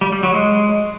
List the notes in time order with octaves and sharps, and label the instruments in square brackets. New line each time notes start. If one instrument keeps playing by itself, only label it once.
[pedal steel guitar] G3
G3
F#3
G#3